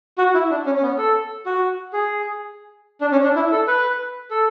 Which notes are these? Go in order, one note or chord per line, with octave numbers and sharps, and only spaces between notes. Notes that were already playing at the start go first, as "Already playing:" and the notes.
F#4
E4
D4
C#4
C#4
B3
A4
F#4
G#4
D4
C#4
D4
E4
A4
B4
A4